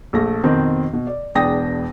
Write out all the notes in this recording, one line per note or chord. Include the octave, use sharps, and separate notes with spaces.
A#1 A3 A#6
F2 B2 D#3 C4
B2
D5
E1 E2 D4 G5 D#6 A#6